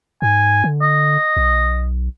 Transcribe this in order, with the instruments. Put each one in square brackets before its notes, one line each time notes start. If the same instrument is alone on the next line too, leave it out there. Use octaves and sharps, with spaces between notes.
[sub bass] G#2 [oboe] G#5
[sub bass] D3
[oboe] D#5
[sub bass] B1